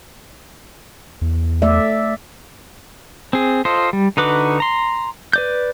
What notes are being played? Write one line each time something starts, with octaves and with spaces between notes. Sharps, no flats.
E2
A3 D5 E5
C4 G#4
F4 A4 C5 D#5
G3
D3 D#4 F#4 B4 D6
A#5 C6
B4 D5 G6